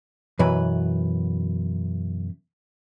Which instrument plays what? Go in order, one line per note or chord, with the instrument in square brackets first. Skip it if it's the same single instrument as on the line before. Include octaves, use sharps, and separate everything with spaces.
[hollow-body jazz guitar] F#2 B2 E3 F#3 B4